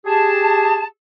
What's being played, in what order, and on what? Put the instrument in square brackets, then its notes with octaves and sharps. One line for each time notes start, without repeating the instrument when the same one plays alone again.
[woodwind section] G4 G#4 [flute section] A5